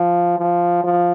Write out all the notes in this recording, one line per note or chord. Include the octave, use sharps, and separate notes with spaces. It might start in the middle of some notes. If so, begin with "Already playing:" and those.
Already playing: F3
F3
F3